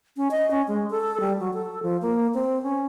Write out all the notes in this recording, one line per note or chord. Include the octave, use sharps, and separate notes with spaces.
C#4
D#5
C#4
G#3
A4
G3
F#3
A4
F3
A#3
C4
C#4